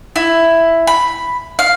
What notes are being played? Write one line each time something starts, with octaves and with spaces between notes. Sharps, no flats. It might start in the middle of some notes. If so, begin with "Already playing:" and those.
E4
B5
F5